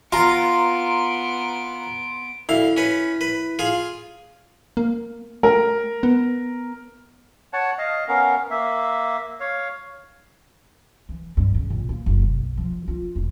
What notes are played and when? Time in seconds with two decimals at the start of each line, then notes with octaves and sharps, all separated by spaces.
0.12 B3 F4 A#5 C6 D7
2.49 D2 E4 F5
2.77 C#4 B4
3.21 B4
3.59 F4 G#4
4.77 A#3
5.43 A3 A#4
6.03 B3
7.53 C#5 F#5 A5
7.78 D#5 F5
8.08 B3 C#4 A#4 F5
8.50 A#3 E5
9.40 C#5 F5
11.09 E3
11.37 G2
11.55 C#3
11.70 A#1
11.89 A#3
12.06 F#1
12.22 B1
12.57 F3
12.88 F4
13.15 E1